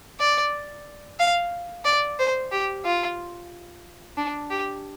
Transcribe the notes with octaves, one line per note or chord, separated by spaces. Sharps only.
D5
F5
D5
C5
G4
F4
D4
G4